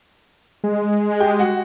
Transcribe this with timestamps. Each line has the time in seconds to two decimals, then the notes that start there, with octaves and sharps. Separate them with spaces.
0.64 G#3
1.20 G4 G5
1.39 F#4 F#5